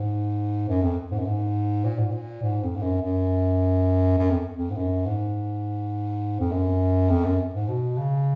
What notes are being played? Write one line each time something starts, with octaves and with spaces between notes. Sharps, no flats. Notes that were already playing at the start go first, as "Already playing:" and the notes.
Already playing: G#2
F#2
F2
G#2
F#2
G#2
A#2
G#2
A#2
G#2
F2
G#2
F#2
F#2
F#2
F2
F2
G#2
F#2
G#2
F2
F#2
F2
F#2
G#2
B2
C#3